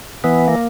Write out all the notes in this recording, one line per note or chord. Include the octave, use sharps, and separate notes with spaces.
E3 B3
A#3